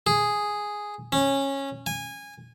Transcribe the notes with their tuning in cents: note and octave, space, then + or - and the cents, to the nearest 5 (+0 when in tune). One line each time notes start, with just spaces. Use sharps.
G#4 +0
C#4 -15
G#5 -20